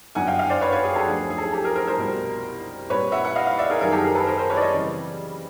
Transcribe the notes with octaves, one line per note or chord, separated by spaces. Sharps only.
G1 F#2 D3 F#5 G#5
F5 G5
F5 G5
C5 D5
B4 C#5
B4 C#5
G#4
G4 A4
D2 D3 F3 G#4
G#4
A4
G#4
G4 A4
G#4 A#4
A#4 C5
A#4 C5
C2 B2 G3
A#2 G3 C4 B4 C#5
E5 F#5
F#5
D#5 F5
D#5 F5
D5 E5
G#4 A#4
F#2 D#3 G3 G#4 A#4
G4 A4
G#4 A#4
A4 B4
A#4 C5
A#4 C5
B4 C#5
D5
C#5 D#5
C#3 E3 G3 C4